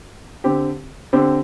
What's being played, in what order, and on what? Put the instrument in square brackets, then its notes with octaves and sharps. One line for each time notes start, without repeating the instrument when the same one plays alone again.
[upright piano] D3 C4 G4
D3 C4 G4